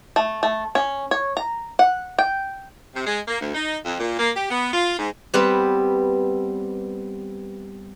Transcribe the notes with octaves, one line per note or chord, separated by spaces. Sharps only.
A3
A3
C#4
C#5
A#5
F#5
G5
C3
G#3
A#3
D2
D#4
F2
A#2
A#3
G4
B3
F4
G#2
G3 B3 C4 G4 B4